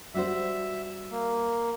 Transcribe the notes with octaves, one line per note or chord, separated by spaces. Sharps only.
G3 F#4 C5 E5
A#3